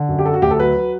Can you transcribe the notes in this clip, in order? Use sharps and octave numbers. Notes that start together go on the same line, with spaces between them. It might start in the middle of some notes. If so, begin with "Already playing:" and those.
Already playing: D3
F#2
G4
F#3 A4
F#4
D2 G4
A4
F#3 B4
F#3